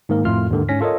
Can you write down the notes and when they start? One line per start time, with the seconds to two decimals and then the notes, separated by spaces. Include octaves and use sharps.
0.09 G#2 D#3 A#3 A#4
0.25 F2 A2 A3 F4 C6 F6
0.50 D#2 G#2 D3 D#3
0.69 G#2 C#4 A#6 B6
0.81 F4 A4 A#4 C#5 D#5